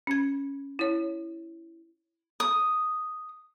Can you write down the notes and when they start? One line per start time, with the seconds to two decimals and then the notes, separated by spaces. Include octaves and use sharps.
0.07 C#4 G#6
0.79 E4 C#5
2.40 D#6